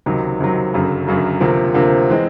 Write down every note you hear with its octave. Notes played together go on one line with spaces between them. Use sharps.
C#2 C3 D#3 F#3
C#2 C3 D#3 F#3
G1 F#2 C#3 F#3
G1 F#2 C#3 F#3
D2 C3 F3 A#3
D2 C3 F3 A#3
E3 G#3 C4